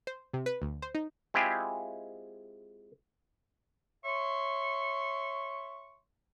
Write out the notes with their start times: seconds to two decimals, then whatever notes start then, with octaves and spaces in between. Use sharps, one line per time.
0.07 C5
0.34 C3
0.46 B4
0.62 D2
0.82 C5
0.95 D#4
1.34 G#3 C4 E4 F4 G4 G#4
4.05 C#5 E5 C6 C#6